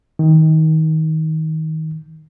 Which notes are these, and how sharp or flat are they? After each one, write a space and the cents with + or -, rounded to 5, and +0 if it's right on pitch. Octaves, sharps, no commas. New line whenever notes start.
D#3 +25